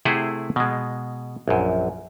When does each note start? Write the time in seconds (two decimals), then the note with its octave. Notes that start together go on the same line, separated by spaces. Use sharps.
0.05 C3 A3 E4 G#4 C5 F#5
0.56 B2 G#3
1.48 A#1 F#2